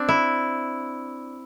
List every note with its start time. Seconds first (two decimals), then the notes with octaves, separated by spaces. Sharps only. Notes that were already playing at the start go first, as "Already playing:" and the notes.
Already playing: C4 D4
0.09 E4